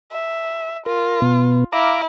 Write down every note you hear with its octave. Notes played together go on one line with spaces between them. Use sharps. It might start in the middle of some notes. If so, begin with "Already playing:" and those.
E5
F4 A#4
B2 B3
E4 F5 A#5 D6